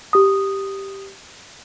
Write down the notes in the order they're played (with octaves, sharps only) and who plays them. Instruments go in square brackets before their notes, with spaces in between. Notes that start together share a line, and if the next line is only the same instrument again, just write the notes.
[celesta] G4 D#6